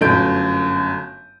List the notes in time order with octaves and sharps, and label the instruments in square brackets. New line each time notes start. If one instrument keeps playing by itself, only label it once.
[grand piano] G1 F#2 A3 G6 D7